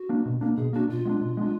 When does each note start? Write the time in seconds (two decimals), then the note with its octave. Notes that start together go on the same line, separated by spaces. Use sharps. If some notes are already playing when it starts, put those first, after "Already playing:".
Already playing: F#4
0.09 A#3 D4
0.26 B2
0.41 A#3 D4
0.57 B2 G#4
0.73 A#3 D4 F#4
0.89 B2 F4
1.05 G#3 B3 D4
1.21 B2
1.37 G#3 B3 D4